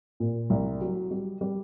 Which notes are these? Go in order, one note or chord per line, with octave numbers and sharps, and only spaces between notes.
A#2
C2
F#3
G3
G3